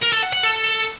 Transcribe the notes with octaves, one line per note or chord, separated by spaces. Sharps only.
A#4
A4
F#5
F#5
A4